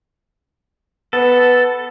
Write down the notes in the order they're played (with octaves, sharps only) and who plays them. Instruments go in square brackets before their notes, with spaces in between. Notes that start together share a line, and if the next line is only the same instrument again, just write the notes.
[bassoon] B3 [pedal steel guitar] A4